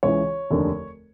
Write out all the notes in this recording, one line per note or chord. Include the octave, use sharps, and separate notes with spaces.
C#2 C#3 E3 C#5
F1 D#2 D3